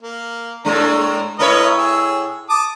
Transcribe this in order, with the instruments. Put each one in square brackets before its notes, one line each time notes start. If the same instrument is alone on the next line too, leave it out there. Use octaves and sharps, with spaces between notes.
[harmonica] A#3
[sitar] A2 G#3 D4 [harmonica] A#5
[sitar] A2 E4 C#5 [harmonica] A#4 B4 D#5
[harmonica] G#4 E6
A5 D6 D#6